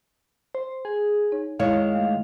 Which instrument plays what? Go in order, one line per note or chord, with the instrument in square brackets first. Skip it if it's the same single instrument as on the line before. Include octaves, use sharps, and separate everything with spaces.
[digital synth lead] C5
G#4
[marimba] D#4 C#5
[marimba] F#2 E4 [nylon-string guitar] D#3 G#3 C#5 [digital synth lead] F5
[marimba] A3